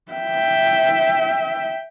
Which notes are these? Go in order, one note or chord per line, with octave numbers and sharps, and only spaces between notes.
E5 G5